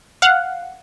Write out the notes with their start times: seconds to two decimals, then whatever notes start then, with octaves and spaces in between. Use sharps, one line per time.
0.22 F5 F#5